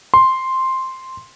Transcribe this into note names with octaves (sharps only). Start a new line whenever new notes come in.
C6